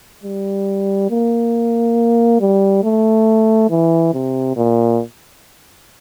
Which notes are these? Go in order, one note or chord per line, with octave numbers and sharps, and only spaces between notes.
G3
A#3
G3
A3
E3
C3
A#2